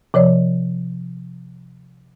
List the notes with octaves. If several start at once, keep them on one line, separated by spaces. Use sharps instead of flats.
C3 F3 C#5 D5